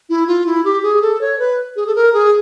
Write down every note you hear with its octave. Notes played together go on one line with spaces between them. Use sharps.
E4
F4
E4
G4
G#4
A4
C#5
B4
G#4
A4
A#4
G#4